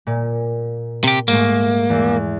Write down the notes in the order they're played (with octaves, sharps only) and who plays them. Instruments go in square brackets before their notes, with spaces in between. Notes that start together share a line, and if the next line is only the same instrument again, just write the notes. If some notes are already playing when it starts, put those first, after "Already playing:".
[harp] A#2
[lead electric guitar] C3 G4
[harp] G#2 A3 [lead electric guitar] A#3
[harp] E2